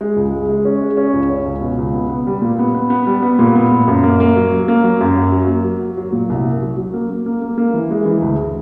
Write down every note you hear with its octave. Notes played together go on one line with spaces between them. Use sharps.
G#3
C#2
G#3
G#3
C#4
G#3
C#4
C#2
C#4
C#2
B2
C#2
B3
B3
G3
A#2
B3
B3
B3
G3
B3
A#2
B3
A#2
F#2
A#3
A#3
F#3
F#3
A#3
F#3
F#2
F#3
F#3
A#3
F#3
F#3
F#3
A#2
C2
A#3
F#3
F#3
A#3
A#3
A#3
A#3
A#3
E3
G#3
E3
D2